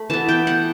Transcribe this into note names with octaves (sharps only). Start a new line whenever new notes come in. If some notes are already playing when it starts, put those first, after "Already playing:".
Already playing: A3 B5
E3 B3 A5
G5
F#5